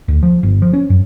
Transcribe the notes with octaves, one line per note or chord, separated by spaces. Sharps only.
D2
F3
G1
F3
C#4
F#2